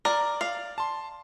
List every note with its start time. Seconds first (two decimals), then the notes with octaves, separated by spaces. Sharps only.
0.05 A#4 D5
0.41 F5
0.78 A5 C6